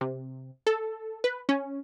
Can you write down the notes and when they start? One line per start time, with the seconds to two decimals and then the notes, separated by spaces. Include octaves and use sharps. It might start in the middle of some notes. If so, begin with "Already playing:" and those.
0.01 C3
0.67 A4
1.24 B4
1.49 C#4